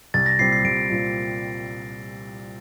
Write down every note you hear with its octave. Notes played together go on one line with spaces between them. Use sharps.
C2 A6
A#6
A#2 G3 C4 C7
C7
C2 D7
A#2 G3 C4